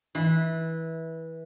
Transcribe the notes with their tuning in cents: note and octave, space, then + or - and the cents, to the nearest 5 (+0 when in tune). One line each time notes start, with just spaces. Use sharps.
E3 -20 B5 +0